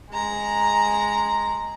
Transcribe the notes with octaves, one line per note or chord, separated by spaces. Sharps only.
G#3 A#5